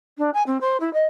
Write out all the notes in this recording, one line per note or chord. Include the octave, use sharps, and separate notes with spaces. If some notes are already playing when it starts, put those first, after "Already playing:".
D4
G#5
C4
C5
E4
D#5